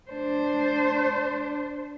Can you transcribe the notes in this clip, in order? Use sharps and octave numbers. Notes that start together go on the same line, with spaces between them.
D4 C5